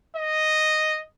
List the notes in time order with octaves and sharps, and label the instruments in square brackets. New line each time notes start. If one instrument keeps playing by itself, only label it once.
[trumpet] D#5